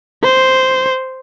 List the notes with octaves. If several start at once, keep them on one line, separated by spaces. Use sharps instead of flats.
C5